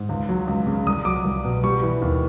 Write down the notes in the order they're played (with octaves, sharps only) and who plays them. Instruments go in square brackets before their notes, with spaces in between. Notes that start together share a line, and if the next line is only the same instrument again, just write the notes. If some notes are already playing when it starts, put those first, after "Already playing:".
Already playing: [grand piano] G#2
C#2
F#3
C#2
C#3
C2 D#6
F#3 D6
C2
B2
G3 C#6
E3
D#2